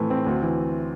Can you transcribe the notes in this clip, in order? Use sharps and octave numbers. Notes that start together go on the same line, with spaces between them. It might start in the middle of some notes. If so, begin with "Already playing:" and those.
Already playing: A2 E3 A3 C4
C4
D2
E3